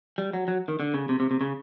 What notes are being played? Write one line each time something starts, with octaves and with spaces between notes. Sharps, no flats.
G3
F#3
F#3
D#3
D3
C#3
C3
C3
C3
C#3